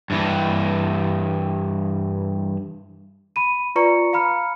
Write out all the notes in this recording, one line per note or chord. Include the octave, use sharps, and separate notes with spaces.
G2 E3
B5 D#7
F4 B4 D5 A#5 C#6 C#7
F5 A#5 B5 F6 C#7